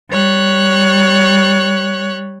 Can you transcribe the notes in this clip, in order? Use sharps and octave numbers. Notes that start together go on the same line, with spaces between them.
G3 C#5 F#6